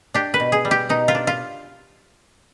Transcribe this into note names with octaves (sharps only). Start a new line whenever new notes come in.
D4 G4
B4
B2
G#4
G3
G4
B2 D#4
F4
D4
F4